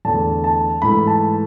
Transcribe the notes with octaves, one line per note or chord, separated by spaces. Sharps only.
E2 D3 A3 A5
A5
G#2 E3 A3 B5
A5